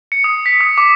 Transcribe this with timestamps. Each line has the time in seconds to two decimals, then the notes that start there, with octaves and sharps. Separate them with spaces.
0.12 C#7
0.24 D#6
0.46 B6
0.61 D#6
0.78 D6